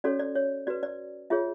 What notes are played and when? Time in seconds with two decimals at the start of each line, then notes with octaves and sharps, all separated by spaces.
0.04 C#4 F#4 A4 C#5 D5
0.20 D5
0.35 C#5
0.67 F#4 B4 D5
0.83 D5
1.30 F4 G#4 C#5 E5